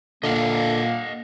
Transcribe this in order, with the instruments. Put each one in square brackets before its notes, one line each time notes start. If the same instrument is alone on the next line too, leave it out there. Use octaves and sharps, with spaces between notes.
[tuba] A#2 [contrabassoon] D3 [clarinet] A#3 [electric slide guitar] D#5 F5 F#5